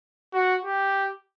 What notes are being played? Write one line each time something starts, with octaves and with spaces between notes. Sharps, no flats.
F#4
G4